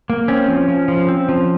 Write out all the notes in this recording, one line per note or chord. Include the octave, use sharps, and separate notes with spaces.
A#3
C4 C#4
F3
F3
F3
C4
F3